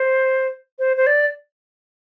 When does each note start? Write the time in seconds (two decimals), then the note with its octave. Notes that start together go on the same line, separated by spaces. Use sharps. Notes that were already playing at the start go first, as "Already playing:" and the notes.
Already playing: C5
0.79 C5
0.97 C5
1.07 D5